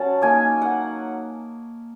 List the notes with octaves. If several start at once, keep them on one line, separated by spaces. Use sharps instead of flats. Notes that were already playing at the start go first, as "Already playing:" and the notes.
Already playing: F#3 C#4 F#5 A5
A#3 D#4 G#5
F#5